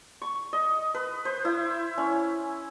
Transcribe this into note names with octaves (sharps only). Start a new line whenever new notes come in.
C#6
D#5
B4
C5
E4
C#4